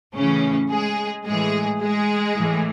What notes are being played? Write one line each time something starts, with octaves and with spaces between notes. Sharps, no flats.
A2 C#3 E3 C#4
G#3 G#4
A2 E3 G#3 G#4
G#3 G#4
A2 E3